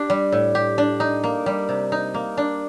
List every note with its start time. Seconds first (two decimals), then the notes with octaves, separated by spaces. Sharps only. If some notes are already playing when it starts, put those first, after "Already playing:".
Already playing: D4 G4
0.10 G3
0.32 A2
0.55 G4
0.78 D4
1.00 D#4
1.24 A#3
1.46 G3
1.69 C3
1.92 D#4
2.14 A#3
2.37 D4